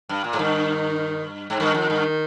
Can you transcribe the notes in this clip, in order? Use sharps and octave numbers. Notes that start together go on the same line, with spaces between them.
G2
A#2
G#2
G2 D#3
G#2
G2 D#3
F2
G2